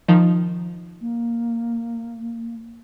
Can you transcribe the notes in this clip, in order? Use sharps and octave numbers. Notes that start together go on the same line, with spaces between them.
D#3 F3 D#4
A#3